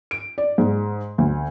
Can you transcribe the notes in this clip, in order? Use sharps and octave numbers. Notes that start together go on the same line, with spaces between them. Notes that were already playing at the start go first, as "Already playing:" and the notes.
D7
D5
G#2
D2